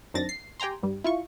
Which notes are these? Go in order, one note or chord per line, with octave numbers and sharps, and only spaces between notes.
F#2 D#3 C4 D4 A6 A#6
C7
G4 G5 G#5 A#5 C6
G2 G3
E4 F4 C#6